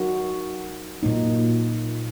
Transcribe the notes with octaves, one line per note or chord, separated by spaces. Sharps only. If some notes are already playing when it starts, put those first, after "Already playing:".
Already playing: F#3 D#4 F#4 A#4
A#2 F#3 A#3 D#4